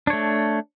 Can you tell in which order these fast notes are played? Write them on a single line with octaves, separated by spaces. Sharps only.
D4 C#5 A3